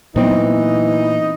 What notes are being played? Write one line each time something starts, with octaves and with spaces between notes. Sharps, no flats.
A#2 E3 F#3 G3 B3 C4 D#4